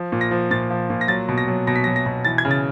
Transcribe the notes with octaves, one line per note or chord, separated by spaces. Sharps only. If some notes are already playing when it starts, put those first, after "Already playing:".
Already playing: F3
A#2
A#6
F3
A#2 A6
F3
A#2
A#6
F#3 A6
B2
A#6
F#3
B2 A#6
B6
A#6
F#3
A#6
B2
E3 A6
G#6
C#3
A6